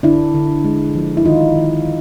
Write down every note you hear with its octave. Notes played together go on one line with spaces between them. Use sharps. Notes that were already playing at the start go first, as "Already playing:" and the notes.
D3 D4 E4
D3
G#3
F3
E4
D#3 D#4 F4
D#3